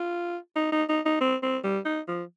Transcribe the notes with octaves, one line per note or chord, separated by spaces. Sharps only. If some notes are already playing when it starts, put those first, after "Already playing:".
Already playing: F4
D#4
D#4
D#4
D#4
C4
C4
G3
D#4
F3